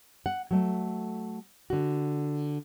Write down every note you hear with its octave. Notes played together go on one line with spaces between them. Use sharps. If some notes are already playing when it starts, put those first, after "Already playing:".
F#5
F#3 A3
D3 F#4